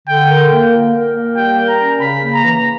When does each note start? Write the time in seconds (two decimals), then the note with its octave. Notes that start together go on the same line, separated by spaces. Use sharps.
0.08 D3 G5
0.30 A#4
0.40 G5
0.51 A#3
0.72 A#2
0.94 A#4
1.15 A#3
1.36 G3 G5
1.58 A#4
1.69 A#5
1.80 C#4
2.01 C#3 B5
2.23 A#3
2.33 A#5
2.44 E3